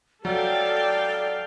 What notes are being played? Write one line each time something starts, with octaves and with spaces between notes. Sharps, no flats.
F#3 A4 D5 F5 G5